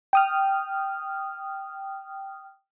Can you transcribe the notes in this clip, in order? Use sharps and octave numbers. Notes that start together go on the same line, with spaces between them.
G5 D#6 F6